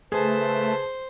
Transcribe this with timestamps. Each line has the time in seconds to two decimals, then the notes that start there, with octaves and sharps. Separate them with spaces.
0.12 C#3 A3 G#4 B4 C5 A5